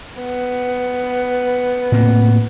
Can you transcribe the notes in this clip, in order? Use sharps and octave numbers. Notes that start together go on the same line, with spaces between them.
B3
A2 A#3 C4